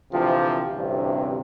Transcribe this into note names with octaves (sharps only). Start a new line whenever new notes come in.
D2 C3 E3 F3 F4 G4
A1 D2 G2 C3